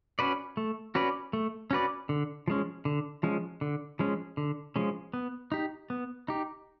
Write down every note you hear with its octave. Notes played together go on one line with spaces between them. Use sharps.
C#4 F#4 B4 D5
A3
C#4 F#4 B4 D5
A3
C#4 F#4 B4 D5
D3
F3 G#3 C#4
D3
F3 G#3 C#4
D3
F3 G#3 C#4
D3
F3 G#3 C#4
B3
D#4 G4
B3
D#4 G4